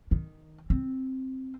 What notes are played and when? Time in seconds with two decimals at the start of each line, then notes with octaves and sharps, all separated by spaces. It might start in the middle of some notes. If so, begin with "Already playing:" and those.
0.11 D#3
0.70 C4